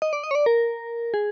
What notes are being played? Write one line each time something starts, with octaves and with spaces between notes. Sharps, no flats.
D#5
D5
D#5
C#5
D5
A#4
G#4